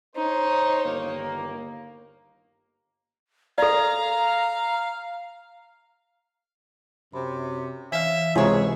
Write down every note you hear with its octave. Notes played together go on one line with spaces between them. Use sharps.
D#4 C5 C#5
G1 D#2 A#3
A4 D5 F5 A#5
F#2 C3 B5
E3 C#4 E5 F5
C#2 C3 G4 G#4 C5 C#5 G#5 A#5